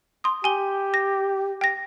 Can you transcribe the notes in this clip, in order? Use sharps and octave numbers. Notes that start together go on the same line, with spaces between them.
C6 D#6
G4 G#5 G7
A#6
G5 A#6